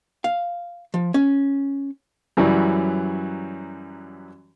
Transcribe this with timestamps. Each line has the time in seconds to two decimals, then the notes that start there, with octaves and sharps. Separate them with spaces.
0.24 F5
0.94 F3
1.14 C#4
2.37 F#2 E3 F#3 G3